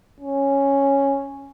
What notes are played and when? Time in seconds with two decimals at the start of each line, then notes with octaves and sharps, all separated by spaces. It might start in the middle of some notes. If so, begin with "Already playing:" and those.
0.21 C#4